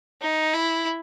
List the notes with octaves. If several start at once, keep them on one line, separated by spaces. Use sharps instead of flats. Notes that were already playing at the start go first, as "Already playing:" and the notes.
D#4
E4